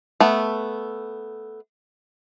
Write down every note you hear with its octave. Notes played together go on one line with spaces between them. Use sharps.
A3 B3